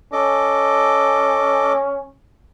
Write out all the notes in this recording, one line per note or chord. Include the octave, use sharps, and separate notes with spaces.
C#4 A4 D#5 D6